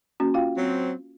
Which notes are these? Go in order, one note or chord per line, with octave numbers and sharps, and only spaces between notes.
A#3 C#4 F#4
F4 F5 G5
F#3 C4